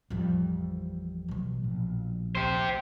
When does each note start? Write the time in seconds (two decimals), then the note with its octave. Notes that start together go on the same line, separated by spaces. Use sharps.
0.10 A1 F2 F3 G3
1.28 B2 F#3
1.64 A#1
2.35 D2 G4 C5